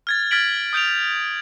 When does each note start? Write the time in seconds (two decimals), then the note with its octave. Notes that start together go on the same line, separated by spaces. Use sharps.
0.07 F6 G#6 A6
0.31 F6 G#6 A6 B6 D7 F#7
0.73 D#6 G6 D7 F7